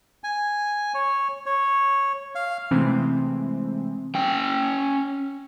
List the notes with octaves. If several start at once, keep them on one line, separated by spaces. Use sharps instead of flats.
G#5
C#5
C#5
F5
C3 E3 G#3 A3 C4
C#4 G5